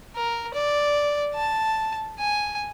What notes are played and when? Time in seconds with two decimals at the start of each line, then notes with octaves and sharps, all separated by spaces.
0.16 A#4
0.54 D5
1.34 A5
2.19 G#5